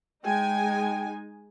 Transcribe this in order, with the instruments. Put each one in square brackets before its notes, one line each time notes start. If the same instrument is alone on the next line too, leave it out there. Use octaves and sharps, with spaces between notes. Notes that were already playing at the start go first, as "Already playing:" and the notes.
[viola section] G#3 D#4 G#5 [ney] G5